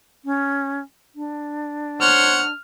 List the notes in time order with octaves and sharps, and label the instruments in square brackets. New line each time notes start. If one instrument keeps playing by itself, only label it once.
[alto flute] C#4
D4
[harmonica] C5 C#5 F#5 [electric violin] F6